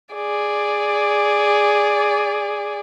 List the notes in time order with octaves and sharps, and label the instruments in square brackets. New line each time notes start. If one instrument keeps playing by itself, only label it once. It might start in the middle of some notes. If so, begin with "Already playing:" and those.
[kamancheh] G#4 D5